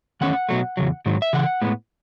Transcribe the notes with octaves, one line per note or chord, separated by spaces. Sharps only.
E2 D#3 A3 C#4 F#5
B2 F#3 A3
E2 C#3 F#3
G#2 D#3 F#3
E5
C#3 E3 F#5
A2 G#3 B3